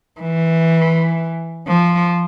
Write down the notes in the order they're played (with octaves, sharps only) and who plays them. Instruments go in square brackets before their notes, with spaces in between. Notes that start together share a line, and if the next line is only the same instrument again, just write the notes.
[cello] E3
F3